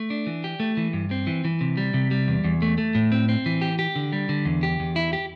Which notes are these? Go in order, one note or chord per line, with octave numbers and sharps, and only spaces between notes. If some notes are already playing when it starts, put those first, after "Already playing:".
Already playing: A3
D4
E3
G4
A3
E3
G2
C4
E3
E3
C3
G3
C3
G3
E2
E2
A3
A3
A2
C4
C4
E3
G4
G4
D3
G3
D3
E2
G4
E2
E4
G4